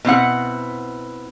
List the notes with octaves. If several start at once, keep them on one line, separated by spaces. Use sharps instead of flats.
B2 C4 E4 F#5